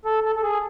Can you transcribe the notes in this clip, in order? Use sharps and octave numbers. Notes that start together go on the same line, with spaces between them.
A4
A4
A4
G#4